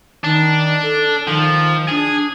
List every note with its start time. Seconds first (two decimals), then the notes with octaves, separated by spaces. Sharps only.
0.24 D#3 D4
0.82 A4
1.28 D#3 F3
1.89 D4 G#4